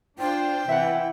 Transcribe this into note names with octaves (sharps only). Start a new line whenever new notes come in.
D4 F4 C5 G5
C3 E3 E5 F#5